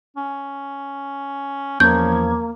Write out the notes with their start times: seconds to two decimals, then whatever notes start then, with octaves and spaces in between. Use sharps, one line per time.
0.17 C#4
1.80 E2 F3 A#3 C#4 G6 G#6